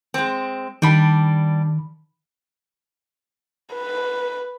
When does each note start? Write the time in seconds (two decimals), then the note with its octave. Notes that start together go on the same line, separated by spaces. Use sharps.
0.14 G#3 C4
0.82 D#3 G3 D4 B5
3.74 B4